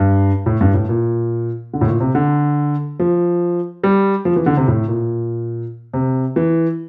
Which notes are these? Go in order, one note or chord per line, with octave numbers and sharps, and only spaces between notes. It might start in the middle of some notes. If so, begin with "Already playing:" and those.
Already playing: G2
A2
G2
A2
A#2
D3
A2
A#2
C3
D3
F3
G3
F3
E3
D3
C3
A2
A#2
C3
E3